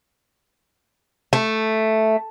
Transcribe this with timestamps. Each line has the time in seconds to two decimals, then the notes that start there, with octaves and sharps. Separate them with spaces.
1.33 A3